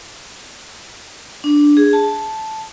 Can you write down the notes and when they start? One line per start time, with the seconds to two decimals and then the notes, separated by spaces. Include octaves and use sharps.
1.44 D4
1.77 G#4
1.93 A5